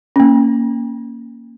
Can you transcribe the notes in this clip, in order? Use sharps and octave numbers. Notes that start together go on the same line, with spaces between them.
A#3 C#4